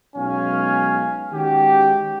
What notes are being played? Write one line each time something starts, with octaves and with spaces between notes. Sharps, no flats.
B1 G#3 B3 C#4 F5 G#5
D#3 G#3 C#4 F#4 G4